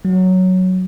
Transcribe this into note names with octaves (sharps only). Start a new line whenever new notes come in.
F#3